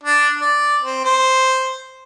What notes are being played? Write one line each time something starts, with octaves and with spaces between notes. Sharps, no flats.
D4
D5
C4
C5